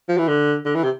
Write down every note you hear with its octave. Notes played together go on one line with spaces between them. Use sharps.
F3
E3
D3
D3
E3
C3